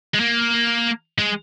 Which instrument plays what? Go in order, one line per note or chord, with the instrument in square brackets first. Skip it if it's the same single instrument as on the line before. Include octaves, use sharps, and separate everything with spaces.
[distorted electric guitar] G#3
A#3
G#3